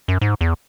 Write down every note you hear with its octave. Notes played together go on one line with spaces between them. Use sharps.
F#2
G#2
E2